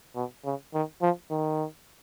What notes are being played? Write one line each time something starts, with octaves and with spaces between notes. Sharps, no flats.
B2
C#3
D#3
F3
D#3